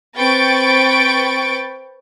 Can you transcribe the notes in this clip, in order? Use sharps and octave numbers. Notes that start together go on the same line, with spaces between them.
C4 B4 G5 C#6 A6 D7